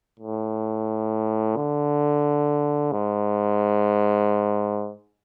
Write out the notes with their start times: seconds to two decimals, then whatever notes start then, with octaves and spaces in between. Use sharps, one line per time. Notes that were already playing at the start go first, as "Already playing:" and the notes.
0.20 A2
1.56 D3
2.92 G#2